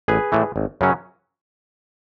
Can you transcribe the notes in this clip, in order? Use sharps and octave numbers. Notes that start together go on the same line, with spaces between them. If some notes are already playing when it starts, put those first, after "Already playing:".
A1 G#4 B4
A2 E3 A3
G#1
F#2 C#3 F#3 C#4